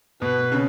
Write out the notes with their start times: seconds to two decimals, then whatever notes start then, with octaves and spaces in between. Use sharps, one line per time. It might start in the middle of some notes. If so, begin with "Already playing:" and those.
0.22 B2 B4
0.52 C#3